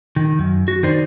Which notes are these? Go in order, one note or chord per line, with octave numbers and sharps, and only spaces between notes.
D#3
F#2
F#4
D#3 D#4 C5 D5